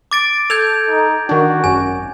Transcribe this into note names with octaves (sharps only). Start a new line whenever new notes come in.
D6 A6 D7
A4 G6 G#6 F7
D#4
D#3 D4 F#4
G#1 F#2 G#5